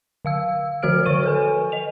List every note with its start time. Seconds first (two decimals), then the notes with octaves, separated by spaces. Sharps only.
0.25 D3 F5 E6
0.83 D3 F3 F#4 C5 F6 D7
1.06 D3 C#5 C#6 D#7
1.23 A4 B4 G#5
1.72 D#5 F7